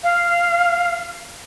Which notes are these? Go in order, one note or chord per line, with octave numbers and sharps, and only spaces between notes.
F5